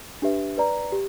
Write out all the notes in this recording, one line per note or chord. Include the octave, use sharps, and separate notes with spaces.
D4 G4 B4 E5
B4 D5 A#5
G4